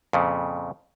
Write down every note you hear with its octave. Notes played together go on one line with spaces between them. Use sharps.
F2 A#2 C#3